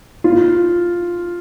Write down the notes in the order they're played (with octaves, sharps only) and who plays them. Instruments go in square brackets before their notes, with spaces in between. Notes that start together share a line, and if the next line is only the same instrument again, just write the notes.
[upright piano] F4